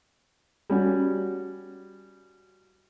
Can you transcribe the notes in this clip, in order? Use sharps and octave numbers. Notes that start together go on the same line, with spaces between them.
G3 C#4 F#4